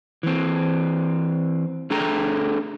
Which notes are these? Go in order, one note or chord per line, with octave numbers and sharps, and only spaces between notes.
E3 C4
A3 D4 G#4 A4 G5 A#5